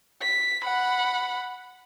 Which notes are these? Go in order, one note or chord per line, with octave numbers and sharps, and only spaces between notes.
B6
F#5 B5